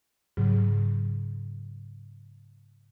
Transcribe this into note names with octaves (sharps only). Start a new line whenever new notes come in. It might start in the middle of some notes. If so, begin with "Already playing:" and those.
G#2 C#3 F#3